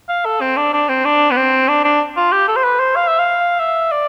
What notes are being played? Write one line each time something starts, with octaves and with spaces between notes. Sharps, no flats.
F5
A4
C4
D4
D4
C4
D4
B3
C4
D4
D4
F4
G4
A4
C5
B4
C5
F5
E5
F5
E5
D5